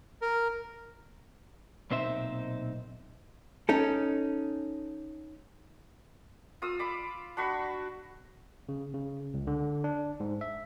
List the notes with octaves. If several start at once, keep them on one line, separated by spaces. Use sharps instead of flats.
A#4
B1 A#2 C4 D#4 C5 E5
C#4 D#4 A4
F4 D#6 E6
B5 D6
D4 F#4 B5 C#6
C#3
C#3
C#2
D3
D4
G#2
E5